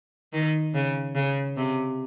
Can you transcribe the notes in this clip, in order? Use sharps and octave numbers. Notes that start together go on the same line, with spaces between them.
D#3
C#3
C#3
C3